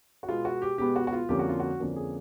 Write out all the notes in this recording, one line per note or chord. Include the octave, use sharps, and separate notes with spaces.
F#4
B2 G#3 B3 F4
F#4
G4
B2 G#3 B3 G4
F#4
F#4
F4
F2 D3 F3 A#3 C#4 G4
F#4
F4
F#4
F2 D3 F3 A#3 C#4
G#4